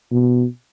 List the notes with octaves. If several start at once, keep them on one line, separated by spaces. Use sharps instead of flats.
B2